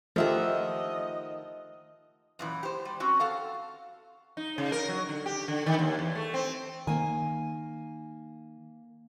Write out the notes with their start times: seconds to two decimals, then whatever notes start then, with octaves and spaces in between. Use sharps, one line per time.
0.16 D#3 F3 A3 G4 D#5 E5 F#5
2.39 F#2 A#2 E3
2.63 G4 C5
2.85 G3
3.00 C4 C#4 F#4
3.20 A4 F5 F#5
4.37 D#4
4.58 C#3
4.72 A#4
4.89 F#3
5.09 D3
5.26 G4
5.48 D3
5.66 D#3
5.79 D#2
5.99 E2
6.15 A3
6.34 C4
6.87 D#3 A#3 G#5